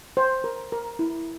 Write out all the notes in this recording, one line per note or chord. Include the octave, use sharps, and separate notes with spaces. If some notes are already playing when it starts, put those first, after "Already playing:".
C5
A#4
A#4
E4